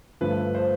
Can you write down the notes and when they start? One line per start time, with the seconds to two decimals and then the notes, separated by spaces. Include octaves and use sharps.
0.21 G2 D3 F3 A3 B4
0.55 C5